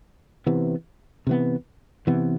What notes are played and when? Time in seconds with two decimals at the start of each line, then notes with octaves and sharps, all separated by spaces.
0.46 C3 E3 B3
1.27 C3 E3 B3
2.07 C3 E3 B3